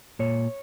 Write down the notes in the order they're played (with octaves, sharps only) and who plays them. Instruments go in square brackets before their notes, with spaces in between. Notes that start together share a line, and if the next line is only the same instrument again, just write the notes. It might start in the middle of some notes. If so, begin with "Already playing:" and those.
[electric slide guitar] A#2 C#5